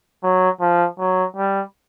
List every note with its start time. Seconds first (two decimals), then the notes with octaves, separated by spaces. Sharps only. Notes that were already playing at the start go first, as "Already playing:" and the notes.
0.23 F#3
0.61 F3
0.99 F#3
1.36 G3